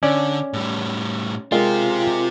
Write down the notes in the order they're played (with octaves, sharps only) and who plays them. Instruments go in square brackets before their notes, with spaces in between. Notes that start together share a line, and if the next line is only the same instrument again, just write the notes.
[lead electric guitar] D3 [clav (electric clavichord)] C#4 D5
[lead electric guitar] A2 G3
[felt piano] G#3 A#4 [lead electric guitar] C4 G4 [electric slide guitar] F4